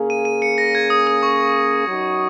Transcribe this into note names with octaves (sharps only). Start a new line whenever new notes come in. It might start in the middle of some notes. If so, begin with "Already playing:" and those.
Already playing: C#3 A#3 C#4 G#4
D#7
D#7
C#7
A#6
G#6
D#6
D#6
C#6
F#2 F#3 D#4 F#4